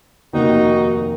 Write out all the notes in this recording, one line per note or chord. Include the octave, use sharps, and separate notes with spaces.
F1 D#2 D#3 A#3 D#4 F#4